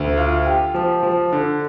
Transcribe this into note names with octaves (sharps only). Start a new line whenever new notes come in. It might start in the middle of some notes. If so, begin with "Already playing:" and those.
Already playing: D2
F4
G4
F3
F3
D3